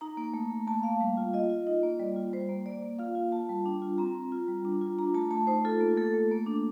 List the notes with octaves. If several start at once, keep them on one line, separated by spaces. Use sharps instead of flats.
D#4 A#5
A#3
A3
A3
A#3 A5
A#3 F5
G3
F4
F4 D#5
F4
D#4 D#5
A#3
G3 D5
F4
G3 C5
A#3
A#3 D5
A#3
F4 F5
F4
F4 A5
G3
D4
F4
C4 A#5
C4
F4
G3
D4
F4
D4 A#5
A3 A5
A3 A5
D#4 C5
F4 A4
A#3
A3 A4
A3
A#3
D4